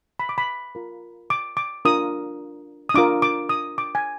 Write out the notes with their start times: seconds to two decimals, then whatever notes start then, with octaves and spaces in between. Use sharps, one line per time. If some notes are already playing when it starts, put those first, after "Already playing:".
0.20 B5
0.29 D6
0.38 B5
0.75 F4 A#4
1.30 D6
1.57 D6
1.85 D4 F4 A#4 D#6
2.89 D#6
2.94 D4 F4 A#4 D6
3.22 D6
3.49 D#6
3.78 D6
3.95 G#5